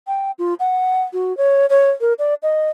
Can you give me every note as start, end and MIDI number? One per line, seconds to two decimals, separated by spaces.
0.07 0.31 79
0.39 0.54 65
0.60 1.03 78
1.13 1.36 66
1.37 1.66 73
1.70 1.90 73
2.01 2.13 70
2.19 2.34 74
2.43 2.70 75